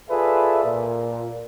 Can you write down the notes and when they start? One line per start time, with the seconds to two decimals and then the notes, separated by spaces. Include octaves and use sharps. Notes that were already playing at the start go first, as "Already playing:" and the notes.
0.10 F4 G#4 A4 B4 D5 E5
0.65 A#2